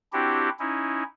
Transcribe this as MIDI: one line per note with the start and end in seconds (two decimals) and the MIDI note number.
0.13 0.49 60
0.13 0.49 62
0.13 0.49 64
0.13 0.49 66
0.13 0.49 67
0.59 1.03 61
0.59 1.03 63
0.59 1.03 64